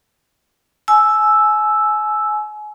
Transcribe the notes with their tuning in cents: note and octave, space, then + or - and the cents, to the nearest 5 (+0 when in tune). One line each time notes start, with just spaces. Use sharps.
G#5 +30 E6 +0